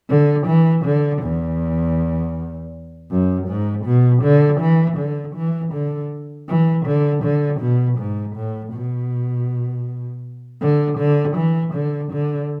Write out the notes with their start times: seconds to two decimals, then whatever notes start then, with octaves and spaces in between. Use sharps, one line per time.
0.09 D3
0.47 E3
0.85 D3
1.23 E2
3.11 F#2
3.48 G#2
3.86 B2
4.23 D3
4.61 E3
4.98 D3
5.36 E3
5.73 D3
6.49 E3
6.86 D3
7.24 D3
7.61 B2
7.99 G#2
8.36 A2
8.74 B2
10.61 D3
10.99 D3
11.37 E3
11.74 D3
12.12 D3